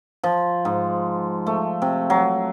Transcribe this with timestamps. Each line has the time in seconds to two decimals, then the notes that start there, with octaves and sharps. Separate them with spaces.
0.23 F3
0.65 G#2
1.46 A3
1.82 C3
2.10 F#3